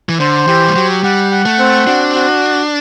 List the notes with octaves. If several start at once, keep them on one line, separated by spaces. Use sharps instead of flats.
E3
D3 C5
E3 G4
G3
F#3 G4
G3 F#5
F#5
A3
C4
D4 F#4
F#4